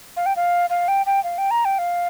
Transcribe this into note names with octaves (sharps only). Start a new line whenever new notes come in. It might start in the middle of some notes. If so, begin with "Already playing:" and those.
F5
G5
F5
F5
G5
G5
F5
G5
A#5
G5
F5